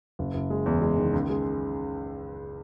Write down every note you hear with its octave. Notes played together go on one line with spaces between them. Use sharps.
F#1
F#1
G#3
E2
G#3
D#3
C#2
G#3